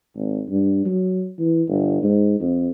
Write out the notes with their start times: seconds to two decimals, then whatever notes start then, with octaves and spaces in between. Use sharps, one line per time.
0.15 G#1
0.49 G2
0.85 F#3
1.39 E3
1.68 G1
2.03 G#2
2.39 F2